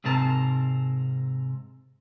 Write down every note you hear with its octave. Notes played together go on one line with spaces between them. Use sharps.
G#2 C3 C4 A#4 A5